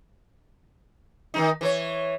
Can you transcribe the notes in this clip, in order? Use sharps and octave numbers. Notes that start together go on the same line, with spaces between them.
D#3 G3 D#4
E3 B4 C#5